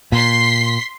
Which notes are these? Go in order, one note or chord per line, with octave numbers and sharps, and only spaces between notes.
A#2 C6 B6 C7